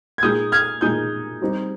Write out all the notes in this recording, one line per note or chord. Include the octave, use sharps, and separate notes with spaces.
G#6
A#2 G#3 D#4 G#4 D#6 G6
F6 G#6
A#2 G#3 D#4 G#4 D#6 G6
G3 C4 D#4 G4